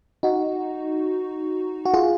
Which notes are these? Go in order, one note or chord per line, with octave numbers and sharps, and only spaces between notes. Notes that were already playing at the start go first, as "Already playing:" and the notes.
D#4 F#4
F#4
F4 G#4